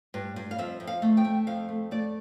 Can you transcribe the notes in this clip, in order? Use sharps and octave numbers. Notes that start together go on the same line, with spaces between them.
G2
G2
F5
F2 E5
F2
F5
A3
G5
A3
F2 F5
A3
A3 D5